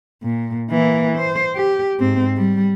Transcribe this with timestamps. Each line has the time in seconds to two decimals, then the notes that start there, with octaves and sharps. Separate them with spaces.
0.23 A#2
0.70 E3 A#3
1.18 C5
1.56 G4
2.00 G#2 C4
2.37 G3